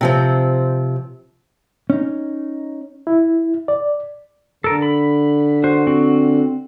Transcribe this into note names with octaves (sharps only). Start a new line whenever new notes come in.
C3 F3 C4
C#4 D#4
E4
D5
D3 A4 A#4
B5
F#4 C5
C4 F#4